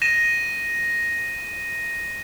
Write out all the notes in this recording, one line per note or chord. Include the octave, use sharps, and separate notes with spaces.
A#6 D#7 E7